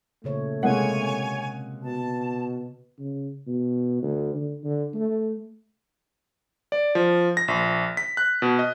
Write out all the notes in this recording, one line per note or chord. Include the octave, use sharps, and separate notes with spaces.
A#2 C#3 A3 C#5
C3 G#3 A#3 C#5 F#5 G#5
B2 A5
C#3
B2
D2
D3
D3
A3
D5
F3
A#6
A#1
B6
F#6
B2
D#5